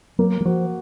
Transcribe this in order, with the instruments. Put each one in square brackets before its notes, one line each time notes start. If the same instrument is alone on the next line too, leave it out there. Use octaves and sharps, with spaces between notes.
[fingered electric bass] F#3 [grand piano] A#3
[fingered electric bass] F#3
[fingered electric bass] F3 [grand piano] F#4